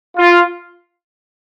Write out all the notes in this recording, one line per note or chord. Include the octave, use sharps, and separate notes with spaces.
F4